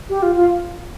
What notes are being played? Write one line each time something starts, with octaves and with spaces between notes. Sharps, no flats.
G4
F4
F4